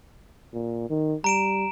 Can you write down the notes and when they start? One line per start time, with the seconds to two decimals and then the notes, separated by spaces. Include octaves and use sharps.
0.53 A#2
0.90 D#3
1.24 G3 A#5 D7 E7